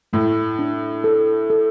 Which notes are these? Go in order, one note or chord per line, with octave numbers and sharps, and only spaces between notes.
A2 A3
D4
A4
A4